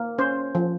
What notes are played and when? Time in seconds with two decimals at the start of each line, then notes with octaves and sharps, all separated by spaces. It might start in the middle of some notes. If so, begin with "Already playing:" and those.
Already playing: A#3
0.18 C#4 C5
0.55 F3